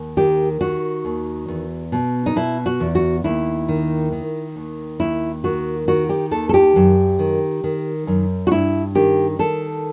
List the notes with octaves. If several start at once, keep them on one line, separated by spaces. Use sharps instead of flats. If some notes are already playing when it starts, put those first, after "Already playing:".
Already playing: D#2
D#3 G4
D#3 F#4
D#2
E2
B2
D#4
B2 E4
F#4
E2
F#4
D#2 E4
D#3
D#3
D#2
D#2 E4
D#3 F#4
D#3 F#4
G4
D#2 A4
A4
G4
F#2
D#3
D#3
F#2
F#4
G2 E4
D#3 G4
D#3 A4